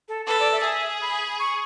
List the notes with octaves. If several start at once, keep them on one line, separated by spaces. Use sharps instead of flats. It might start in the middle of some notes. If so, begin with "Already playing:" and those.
A4
A4 B4
D5
E5
G#4
B5
C#6